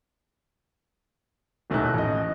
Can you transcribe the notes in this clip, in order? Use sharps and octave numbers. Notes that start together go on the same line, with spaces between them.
D#1 B1 A3 D#4 E4 F#6
A1 D#5